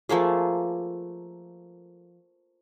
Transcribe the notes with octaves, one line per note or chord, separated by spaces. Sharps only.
F3 A3 A#3 G#4